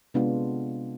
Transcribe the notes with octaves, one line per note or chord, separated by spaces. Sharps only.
C3 G#3 B3 D4 F4